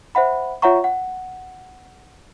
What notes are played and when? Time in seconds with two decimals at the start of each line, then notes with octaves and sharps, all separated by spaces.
0.15 C5 E5 F#5 B5
0.62 F4 C#5 E5 F#5 A#5 C#6
0.84 F#5